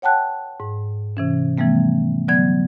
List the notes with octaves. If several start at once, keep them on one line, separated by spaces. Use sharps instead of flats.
C#5 F#5 G5 A5 F#6
G#2
C3 E3 C#4
C3 E3 F3 G3 A3 B3
D3 F#3 B3 D5 G#6